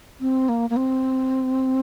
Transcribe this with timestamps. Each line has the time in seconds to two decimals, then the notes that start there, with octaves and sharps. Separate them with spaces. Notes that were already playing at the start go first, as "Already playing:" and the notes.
0.21 C4
0.49 A#3
0.70 A#3
0.77 C4